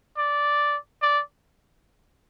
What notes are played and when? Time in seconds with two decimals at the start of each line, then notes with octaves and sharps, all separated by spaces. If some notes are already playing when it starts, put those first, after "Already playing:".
0.17 D5
1.02 D5